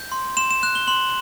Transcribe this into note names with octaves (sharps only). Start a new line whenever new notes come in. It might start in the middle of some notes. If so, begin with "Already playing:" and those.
Already playing: G6
C6
C6 E7
E7
F#6 E7
G7
C6 F#7